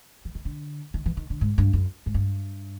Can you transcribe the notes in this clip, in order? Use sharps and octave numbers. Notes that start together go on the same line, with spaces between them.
E3
D#3
D3
D#3
E3
D#3
D3
G#2
G2
F#2
G#2
G2